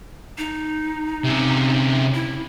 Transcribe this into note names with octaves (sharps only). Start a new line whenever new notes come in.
D#4
C3 C#4
E4